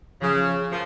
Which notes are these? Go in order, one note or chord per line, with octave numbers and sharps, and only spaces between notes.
C#3 F3
F3 A#4